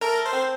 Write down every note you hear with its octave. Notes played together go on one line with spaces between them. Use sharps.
A3 A#4
C5
C4